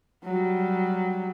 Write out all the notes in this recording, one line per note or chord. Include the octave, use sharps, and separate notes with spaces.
F#3 G3